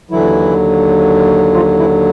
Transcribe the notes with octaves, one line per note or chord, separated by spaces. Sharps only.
D#2 D3 E3 F#3 E4
F3 F4
E3 E4